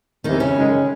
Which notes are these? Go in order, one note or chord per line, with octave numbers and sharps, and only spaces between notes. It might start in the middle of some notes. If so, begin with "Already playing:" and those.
E2 C3 D#3 E3 D#4
C#3 C#4
F#2 D#3 G#3